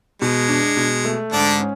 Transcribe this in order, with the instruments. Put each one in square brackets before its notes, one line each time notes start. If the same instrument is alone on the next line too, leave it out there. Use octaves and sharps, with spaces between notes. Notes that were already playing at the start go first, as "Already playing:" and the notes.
[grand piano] B2 [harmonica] G#3
[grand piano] D4
B2
A3
[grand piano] G#2 [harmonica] D3 D4
[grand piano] C#4